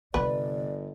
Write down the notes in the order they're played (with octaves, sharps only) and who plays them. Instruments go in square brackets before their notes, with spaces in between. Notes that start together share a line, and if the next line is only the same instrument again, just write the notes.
[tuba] G1 [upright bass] C3 G3 [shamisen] B4 [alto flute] D5